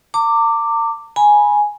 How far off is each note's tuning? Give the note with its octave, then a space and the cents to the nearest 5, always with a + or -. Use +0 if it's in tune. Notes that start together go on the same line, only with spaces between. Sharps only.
A#5 -45 D6 +0
G#5 +0 B5 -30